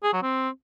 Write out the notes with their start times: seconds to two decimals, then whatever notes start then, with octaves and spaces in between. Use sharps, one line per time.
0.03 G#4
0.13 F#3
0.22 C4